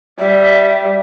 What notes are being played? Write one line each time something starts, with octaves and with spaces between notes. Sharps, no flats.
G3 E5